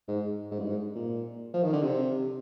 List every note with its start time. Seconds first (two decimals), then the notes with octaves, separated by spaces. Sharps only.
0.08 G#2
0.51 G#2
0.59 G2
0.67 G#2
0.95 A#2
1.53 F3
1.63 D#3
1.73 D3
1.83 C3